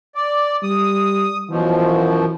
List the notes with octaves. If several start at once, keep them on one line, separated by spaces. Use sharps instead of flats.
D5
G3 D#6
F#2 B2 E3 F3